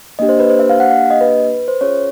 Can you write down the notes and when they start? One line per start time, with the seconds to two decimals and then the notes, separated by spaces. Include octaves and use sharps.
0.19 A#3 D4 G4 D#5
0.29 C5
0.40 B4
0.50 C5
0.59 E5
0.70 F5
0.80 F#5
0.89 F5
1.10 D#5
1.21 B4
1.40 B4
1.68 C5
1.81 C#4 F4 G#4 C#5